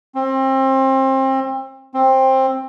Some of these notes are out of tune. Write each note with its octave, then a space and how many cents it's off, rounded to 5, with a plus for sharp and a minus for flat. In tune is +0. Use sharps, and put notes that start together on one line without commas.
C4 +30
C4 +15